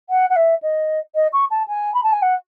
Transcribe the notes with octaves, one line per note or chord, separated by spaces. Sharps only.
F#5
F#5
E5
D#5
D#5
C#6
A5
G#5
B5
A5
G#5
F#5